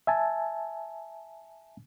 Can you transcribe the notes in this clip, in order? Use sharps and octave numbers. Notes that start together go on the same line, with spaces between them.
E5 G#5 A5